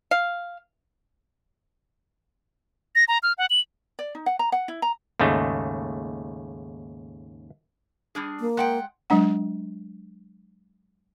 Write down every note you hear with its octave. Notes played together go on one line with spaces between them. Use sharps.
F5
A#6
A#5
F6
F#5
F#7
D5
D#4
F#5
A#5
F#5
E4
A#5
D#2 G#2 C#3 A3 D#4
G3 D4 G#4
A#3
G#3 F#5 G5
F#3 G#3 D4 F#5